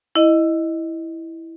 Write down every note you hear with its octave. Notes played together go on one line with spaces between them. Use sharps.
E4 D#5